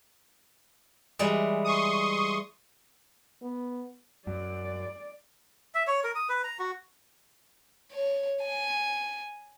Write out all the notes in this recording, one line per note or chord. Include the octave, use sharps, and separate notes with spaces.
E3 G3 G#3
C6 C#6 D#6
B3
F#2 D5
E5
C#5
A#4
D#6
B4
A#5
F#4
C#5
G#5